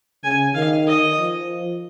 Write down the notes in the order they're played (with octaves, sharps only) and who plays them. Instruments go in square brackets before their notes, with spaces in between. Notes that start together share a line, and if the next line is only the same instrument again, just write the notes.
[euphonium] C#3 [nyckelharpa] G#5
[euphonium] D#3 [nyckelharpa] F5
[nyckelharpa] D#5
[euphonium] F3